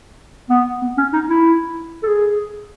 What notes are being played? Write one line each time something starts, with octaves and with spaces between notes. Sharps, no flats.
B3
B3
C#4
D#4
E4
A4
G#4